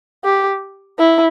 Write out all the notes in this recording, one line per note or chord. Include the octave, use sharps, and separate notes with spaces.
G4
E4